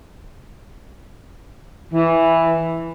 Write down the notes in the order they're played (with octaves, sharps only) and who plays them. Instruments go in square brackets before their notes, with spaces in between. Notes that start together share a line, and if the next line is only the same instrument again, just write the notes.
[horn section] E3